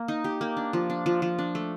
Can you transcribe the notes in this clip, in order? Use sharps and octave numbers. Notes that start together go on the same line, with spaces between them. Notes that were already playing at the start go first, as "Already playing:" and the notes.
Already playing: A#3
D#4
G4
A#3
D4
F3
D4
F3
F3
D4
A3